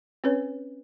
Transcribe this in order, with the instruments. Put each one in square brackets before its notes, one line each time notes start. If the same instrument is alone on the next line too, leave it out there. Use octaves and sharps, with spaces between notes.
[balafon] C4 C#4 B4 C#5